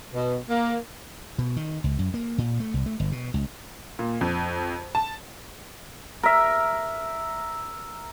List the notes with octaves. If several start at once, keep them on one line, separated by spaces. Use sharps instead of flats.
B2
A#3
B2
D#3
C#2
F#2
A#3
A#2
A3
C2
A3
G1
B2
C#2
A#2
F2
A5
A#4 E5